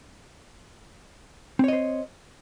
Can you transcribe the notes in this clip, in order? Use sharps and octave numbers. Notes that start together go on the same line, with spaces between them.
C4 C5 C#5 D#5